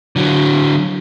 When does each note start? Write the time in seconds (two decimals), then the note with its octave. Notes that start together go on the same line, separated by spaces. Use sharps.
0.16 D3 F#3